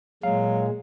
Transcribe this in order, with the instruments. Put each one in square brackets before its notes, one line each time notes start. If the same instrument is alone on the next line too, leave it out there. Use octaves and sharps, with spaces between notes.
[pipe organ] A#2 G#3 [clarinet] F#3 [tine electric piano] F5